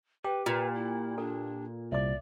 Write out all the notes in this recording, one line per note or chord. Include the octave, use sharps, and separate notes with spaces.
G4 B4 G5
A#2 F4 B4
E4
D4 A4
C2 D5 E5 D6